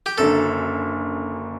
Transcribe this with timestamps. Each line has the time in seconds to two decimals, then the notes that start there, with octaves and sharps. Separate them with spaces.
0.06 G4
0.18 F#1 F#2 D3 A4